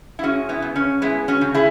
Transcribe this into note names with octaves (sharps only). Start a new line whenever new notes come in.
E4
G#3 C#4 F#4
B3 E4
C#3
C#4
G#3 B3 E4
C#4 F#4
C#3
E4 G#4